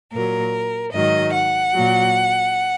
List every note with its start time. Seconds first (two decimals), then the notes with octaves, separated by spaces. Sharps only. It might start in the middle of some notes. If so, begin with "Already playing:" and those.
0.12 A#2 F#3 A#4
0.92 G#2 D#3 F#3 D#5
1.33 F#5
1.74 A#2 F#3